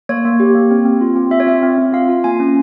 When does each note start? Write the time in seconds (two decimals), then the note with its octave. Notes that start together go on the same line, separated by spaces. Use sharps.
0.09 A#3 C#5
0.25 A#3
0.40 G4
0.55 A#3
0.71 C4
0.85 C4
1.01 F4
1.16 C4
1.31 F4 E5
1.40 C#5
1.47 C4 E5
1.63 C4
1.78 C4
1.93 F4 F5
2.09 F4
2.24 A#3 G#5
2.40 C#4